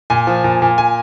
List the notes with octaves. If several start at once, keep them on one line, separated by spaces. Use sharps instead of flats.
A#2 G#5
F3
A#2
A#2
G#5